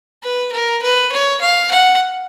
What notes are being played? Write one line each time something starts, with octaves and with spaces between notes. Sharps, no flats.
B4
A#4
B4
C#5
F5
F#5